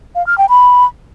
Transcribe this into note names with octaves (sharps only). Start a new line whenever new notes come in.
F5
F6
G5
B5